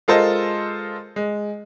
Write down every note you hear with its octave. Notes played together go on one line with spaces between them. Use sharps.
G#3 F4 A4 A#4 C5 D#5
G#3